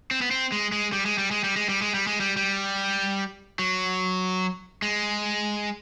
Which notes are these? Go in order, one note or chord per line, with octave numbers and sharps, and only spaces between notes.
C4
B3
C4
G#3
G#3
G3
G#3
G3
G#3
G3
G#3
G3
G#3
G3
G#3
G3
G3
F#3
G#3